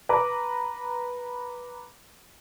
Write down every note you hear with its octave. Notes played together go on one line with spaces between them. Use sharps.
B4 A#5 D6